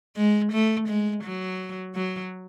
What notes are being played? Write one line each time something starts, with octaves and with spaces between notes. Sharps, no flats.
G#3
A3
G#3
F#3
F#3